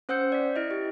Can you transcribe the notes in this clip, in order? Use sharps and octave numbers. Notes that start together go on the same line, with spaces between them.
C#4 C5 F#5 E6 G6 C#7
D5 B6
E4 D#5
G4